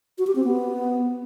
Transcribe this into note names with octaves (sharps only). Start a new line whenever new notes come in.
F#4
G4
C4
B3